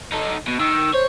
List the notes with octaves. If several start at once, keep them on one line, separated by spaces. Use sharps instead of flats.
D#4 A4
B2
D#3 E6
C5 C#5